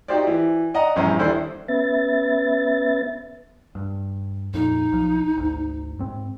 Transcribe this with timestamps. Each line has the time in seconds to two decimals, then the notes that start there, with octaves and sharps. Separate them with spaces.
0.08 D#4 F#4 G4 C5 D5
0.27 E3
0.74 D5 D#5 F#5 A#5
0.96 A#1 E2 G2 C#4 C5 A#5
1.19 D#2 D4 E4 A4 C5
1.68 B3 C#4 B4 E5 A6
3.75 G2
4.54 F2 A#2 D#4
4.92 B1 F3
5.37 G#1 D2
5.99 G#2 C4